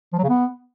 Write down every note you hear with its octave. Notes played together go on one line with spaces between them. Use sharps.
F3
F#3
C#3
B3